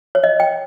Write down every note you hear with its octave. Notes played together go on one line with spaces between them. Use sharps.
C#5
D#5
G5